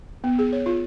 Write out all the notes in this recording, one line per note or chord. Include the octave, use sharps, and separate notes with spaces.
B3
G#4
C#5
F4